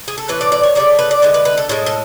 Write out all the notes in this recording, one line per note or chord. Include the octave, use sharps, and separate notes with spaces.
G#4
A4
A2 E3 A3 B4
D5
D5
C#5
C#3 F#3 A3 D5
B4
D5
D3 G#3 B4
B4
B4
A4
A2 G#3 A4
A4